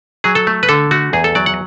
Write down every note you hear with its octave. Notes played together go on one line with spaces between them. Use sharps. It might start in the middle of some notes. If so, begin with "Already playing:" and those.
F#3 G#4
A4
A3
B4
D3 A4
A3 F#4
E2 G#4
A4
F#3 D5
F#5